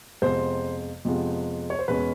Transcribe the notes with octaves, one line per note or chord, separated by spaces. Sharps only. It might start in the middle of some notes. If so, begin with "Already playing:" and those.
F2 C3 F3 G#3 B3 C5
F2 C3 F3 G#3 B3
C#5
C5
E2 B2 G#3 C#4 B4